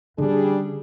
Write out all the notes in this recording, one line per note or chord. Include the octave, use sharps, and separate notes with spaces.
D3 G3 C#4 D4 G#4